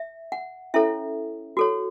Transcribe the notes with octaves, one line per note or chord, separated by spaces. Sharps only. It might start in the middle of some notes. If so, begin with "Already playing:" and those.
Already playing: E5
F#5
C#4 E4 A4 C#5 E5
F#4 A4 C#5